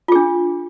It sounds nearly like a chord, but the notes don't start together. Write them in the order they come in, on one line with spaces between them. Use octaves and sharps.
F4 G#4 D4